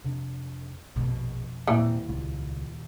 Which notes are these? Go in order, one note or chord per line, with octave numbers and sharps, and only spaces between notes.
F2 C3 D4
A#1 F2 B2
D#1 A#2 E3 C4
C#2 F4